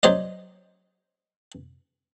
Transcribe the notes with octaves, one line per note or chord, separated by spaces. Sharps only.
F#3 C5 D5 D#5